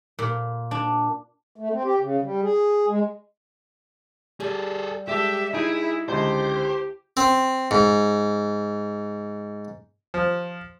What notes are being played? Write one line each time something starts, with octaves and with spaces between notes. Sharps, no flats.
A#2
D4
A3
C4
G4
C#3
G3
G#4
G#3
G3 G#4 A4
G#3 G4 A4 E5
D#4 E4 G#4 D7
C#2 D3 G4 C5 D#5
C4
G#2
F3